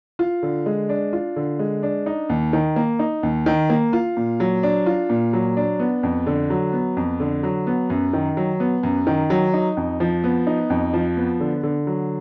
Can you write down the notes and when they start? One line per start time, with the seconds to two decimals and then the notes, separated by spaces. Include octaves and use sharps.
0.19 F4
0.43 D3
0.66 G#3
0.89 D4
1.13 F4
1.36 D3
1.59 G#3
1.83 D4
2.06 D#4
2.29 D#2
2.53 D#3
2.76 A#3
2.99 D#4
3.23 D#2
3.46 D#3
3.70 A#3
3.93 F4
4.17 A#2
4.40 F#3
4.63 D4
4.86 F4
5.10 A#2
5.33 F#3
5.57 D4
5.80 B3
6.03 F2
6.27 D3
6.50 F#3
6.73 B3
6.97 F2
7.20 D3
7.43 F#3
7.67 B3
7.90 F#2
8.13 D#3
8.37 F#3
8.60 B3
8.83 F#2
9.07 D#3
9.30 F#3
9.54 D#4
9.77 F2
10.00 F3
10.24 B3
10.47 D#4
10.70 F2
10.94 F3
11.17 B3
11.40 D3
11.63 D3
11.87 F#3